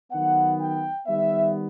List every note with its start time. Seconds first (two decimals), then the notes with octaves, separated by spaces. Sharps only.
0.11 D#3 F#3 B3 F#5
0.59 G5
1.07 D#3 G3 B3 E5